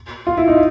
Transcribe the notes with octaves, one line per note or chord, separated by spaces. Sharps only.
F4
E4
D#4